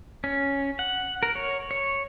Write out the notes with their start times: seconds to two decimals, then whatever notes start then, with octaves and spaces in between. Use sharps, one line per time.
0.24 C#4
0.79 F#5
1.23 A#4
1.35 C#5
1.71 C#5